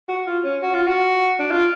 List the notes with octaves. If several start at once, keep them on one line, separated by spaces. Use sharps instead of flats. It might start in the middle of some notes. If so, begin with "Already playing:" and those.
F#4
F4
C#4
F#4
F4
F#4
D4
F4